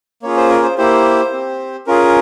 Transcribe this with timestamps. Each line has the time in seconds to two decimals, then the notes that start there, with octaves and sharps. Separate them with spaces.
0.23 A#3 C#4 F4 G#4 C#5
0.37 C5
0.49 A#4
0.63 C5
0.78 A#3 E4 G4 C5
1.32 C4 G4
1.87 C#4 F4 G#4 A#4